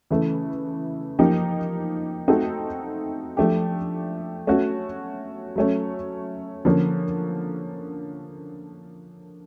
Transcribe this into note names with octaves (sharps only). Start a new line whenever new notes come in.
C#3 E3 A3
F3 A#3 D#4 G4
A3 C4 D#4 F#4 A4
F3 A3 D4 G4
A3 C#4 F#4
F#3 A3 C#4
D3 F3 A#3 C#4